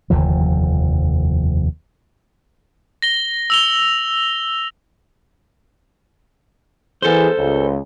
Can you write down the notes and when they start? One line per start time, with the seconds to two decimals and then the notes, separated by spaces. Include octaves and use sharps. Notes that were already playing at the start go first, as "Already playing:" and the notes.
0.10 F1 D#2 D3 F3
3.02 A#6 G7
3.50 E6 F7 G7
7.02 E3 B3 G#4 A4 C5
7.37 C#2